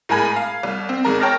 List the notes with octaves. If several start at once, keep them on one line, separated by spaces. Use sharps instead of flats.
A2 G#3 A#4 G#5 B5 G#6
F5
C2
C4
G#1 G#3 A#4
A#4 C#5 G5 A5 F6 A#6